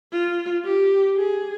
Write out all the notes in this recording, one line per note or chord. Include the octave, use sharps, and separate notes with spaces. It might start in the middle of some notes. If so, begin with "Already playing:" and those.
F4
G4
G#4